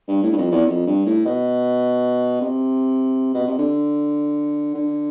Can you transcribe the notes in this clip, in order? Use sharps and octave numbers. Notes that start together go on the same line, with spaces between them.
G2
A2
G2
F2
E2
F2
G2
A2
B2
C3
B2
C3
D3
D3